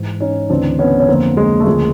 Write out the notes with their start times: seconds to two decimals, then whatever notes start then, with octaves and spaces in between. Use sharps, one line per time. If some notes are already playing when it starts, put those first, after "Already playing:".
Already playing: G#2 E3
0.21 C#4 D#4
0.50 D2 C#3 E3 C4 D4
0.79 B3 C#4
1.00 C#4
1.08 F2 D3 F3 A#3 C4
1.37 G#3 A#3
1.60 A3
1.67 D2 C#3 F3 G#3 A#3